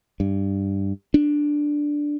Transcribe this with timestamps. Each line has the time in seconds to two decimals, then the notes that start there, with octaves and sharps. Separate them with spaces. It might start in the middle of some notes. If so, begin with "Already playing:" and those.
0.20 G2
1.14 D4